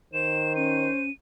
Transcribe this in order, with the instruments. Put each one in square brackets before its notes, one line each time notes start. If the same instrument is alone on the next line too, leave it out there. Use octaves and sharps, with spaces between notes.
[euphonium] D#3 [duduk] C5 [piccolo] E7
[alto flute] C#4 [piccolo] D#7